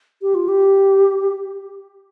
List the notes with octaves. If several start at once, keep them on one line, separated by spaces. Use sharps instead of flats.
G4
F4
G4